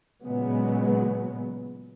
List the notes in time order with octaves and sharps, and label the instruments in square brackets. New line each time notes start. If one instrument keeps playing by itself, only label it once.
[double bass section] A#2 C#3 F#3 G#3 B3